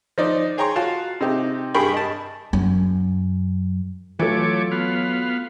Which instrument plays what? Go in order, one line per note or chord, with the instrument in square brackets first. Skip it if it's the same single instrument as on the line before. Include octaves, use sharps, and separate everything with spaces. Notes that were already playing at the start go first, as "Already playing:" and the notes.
[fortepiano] F3 D#4 D5
G#4 C#5 G5 A#5 C6 C#6
F4 F#4 F5 A5
C3 D#4 G4
G2 G#4 A#4 G5 B5 C#6
D#5 A5
[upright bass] F#2
[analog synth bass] E3 [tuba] F#3 [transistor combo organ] A3 C#5 D6 [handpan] F4 A4
[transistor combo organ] B3 F5